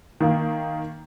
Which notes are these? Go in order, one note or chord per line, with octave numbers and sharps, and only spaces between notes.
D#3 A#3